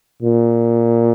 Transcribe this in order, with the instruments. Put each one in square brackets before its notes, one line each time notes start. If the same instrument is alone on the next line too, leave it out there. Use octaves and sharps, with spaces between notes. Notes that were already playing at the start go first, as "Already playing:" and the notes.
[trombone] A#2